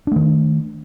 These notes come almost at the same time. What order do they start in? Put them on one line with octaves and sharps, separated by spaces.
D4 A3 D#3